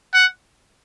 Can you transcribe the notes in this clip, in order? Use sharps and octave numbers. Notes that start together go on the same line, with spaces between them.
F#5